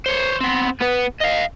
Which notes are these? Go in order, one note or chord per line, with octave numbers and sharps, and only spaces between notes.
C5 C#5
B3 C4
B3 B4
D#5 F5